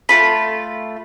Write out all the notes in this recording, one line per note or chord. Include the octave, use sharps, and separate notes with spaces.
A3 F4 B5